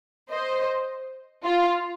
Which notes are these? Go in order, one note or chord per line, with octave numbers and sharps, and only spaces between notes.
C5 D#5
F4